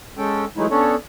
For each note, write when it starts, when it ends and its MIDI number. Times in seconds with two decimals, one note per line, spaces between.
0.17 0.45 56
0.17 0.45 61
0.17 0.45 69
0.17 0.45 79
0.57 0.66 52
0.57 0.66 54
0.57 0.66 56
0.57 0.66 57
0.57 0.66 63
0.57 0.66 64
0.70 0.96 59
0.70 0.96 61
0.70 0.96 62
0.70 0.96 69
0.70 0.96 73